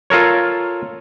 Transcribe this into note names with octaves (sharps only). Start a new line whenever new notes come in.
F4 A4 A#4 C#5